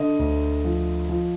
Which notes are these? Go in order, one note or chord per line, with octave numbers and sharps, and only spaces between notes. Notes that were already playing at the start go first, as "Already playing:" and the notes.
Already playing: D3 D#5
D2
F3
F3